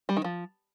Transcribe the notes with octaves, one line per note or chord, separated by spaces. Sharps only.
G3
D#3
F3